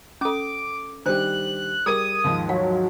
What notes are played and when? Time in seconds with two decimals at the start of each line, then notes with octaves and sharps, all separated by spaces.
0.21 C#4 A4 D6
1.06 D#3 G3 D4 G4 C5 F#6
1.86 G3 G#4 A#4 D#6 G#6 D#7
2.24 D#2 G#2 F3
2.49 F#3 F5